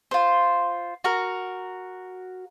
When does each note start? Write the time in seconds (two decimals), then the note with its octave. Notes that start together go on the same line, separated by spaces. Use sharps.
0.11 F4 C5
1.04 F#4 A#4